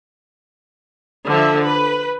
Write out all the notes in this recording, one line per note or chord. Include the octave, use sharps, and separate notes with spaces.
D3 F3 E5
B4